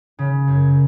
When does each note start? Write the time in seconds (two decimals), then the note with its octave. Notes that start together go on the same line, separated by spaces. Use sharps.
0.19 C#3
0.47 F#2